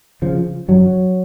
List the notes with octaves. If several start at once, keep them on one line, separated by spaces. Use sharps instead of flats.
C#3 F3
F#2 F#3